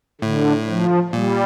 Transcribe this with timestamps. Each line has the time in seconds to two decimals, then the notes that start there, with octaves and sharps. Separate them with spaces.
0.21 A2 D3
0.67 F3
1.13 A#2 G3